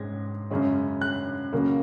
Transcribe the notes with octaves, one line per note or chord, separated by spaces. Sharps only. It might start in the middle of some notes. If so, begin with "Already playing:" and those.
Already playing: G#2 G#3 C#4 G#6 A#6
F#2 C#3 G#3 C#4
F#6
C#2 C#3 F#3 A#3